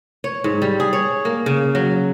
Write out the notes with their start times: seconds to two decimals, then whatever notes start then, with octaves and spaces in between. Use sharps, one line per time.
0.24 C#5
0.44 G#2
0.62 G3
0.80 G#4
0.93 C#5
1.25 A#3
1.46 C#3
1.75 F#3